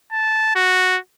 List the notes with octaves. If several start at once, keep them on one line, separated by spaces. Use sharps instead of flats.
A5
F#4